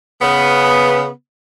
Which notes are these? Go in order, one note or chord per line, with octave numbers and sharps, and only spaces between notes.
C#3 B3